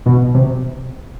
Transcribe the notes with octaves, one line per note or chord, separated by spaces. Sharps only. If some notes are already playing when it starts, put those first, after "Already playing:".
B2
C3